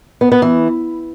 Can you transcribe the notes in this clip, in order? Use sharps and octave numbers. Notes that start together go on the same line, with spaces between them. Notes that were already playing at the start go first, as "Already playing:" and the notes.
B3
B3
E3